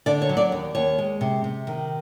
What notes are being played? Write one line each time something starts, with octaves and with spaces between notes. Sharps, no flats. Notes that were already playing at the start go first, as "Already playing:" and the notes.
D3 D5
C#5
F#3
D5
D#2
D#2 C#5
G#3
C3
C3
D#3